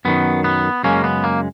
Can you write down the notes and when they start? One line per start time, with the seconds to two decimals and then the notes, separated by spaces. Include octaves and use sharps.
0.05 F#2 D#3 F#3 B3
0.44 B3
0.83 F#2 C#3 G#3 A#3 C#4
1.04 B3
1.24 A#3